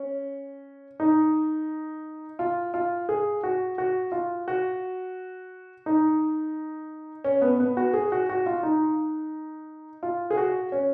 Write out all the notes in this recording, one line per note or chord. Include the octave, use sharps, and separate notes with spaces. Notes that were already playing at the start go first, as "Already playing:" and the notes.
Already playing: C#4
D#4
F4
F4
G#4
F#4
F#4
F4
F#4
D#4
C#4
B3
B3
F#4
G#4
F#4
F#4
F4
D#4
F4
G#4
F#4
C#4